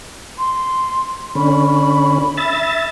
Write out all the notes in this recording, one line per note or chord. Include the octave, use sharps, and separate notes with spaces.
C6
D3 C#4 B5
E5 A6